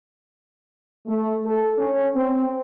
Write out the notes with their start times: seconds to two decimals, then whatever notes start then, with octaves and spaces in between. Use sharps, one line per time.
1.07 A3
1.46 A4
1.79 C#4
2.16 C4